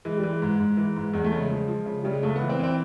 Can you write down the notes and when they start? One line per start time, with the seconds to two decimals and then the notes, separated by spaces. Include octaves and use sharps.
0.05 E3 G#3
0.17 G3
0.23 E3
0.30 G#3
0.42 G#2
0.60 G#2
0.77 E3
0.96 G#2
1.14 E2 G#3
1.24 A3
1.32 C#3 G#3
1.50 F3
1.68 F3
1.86 C#3
2.03 C#3 G3
2.13 G#3
2.23 C#2 A3
2.36 B3
2.40 E3
2.49 C4
2.59 E3 C4